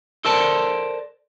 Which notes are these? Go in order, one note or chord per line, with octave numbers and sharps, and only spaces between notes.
A4 A#4 C5 D5 A5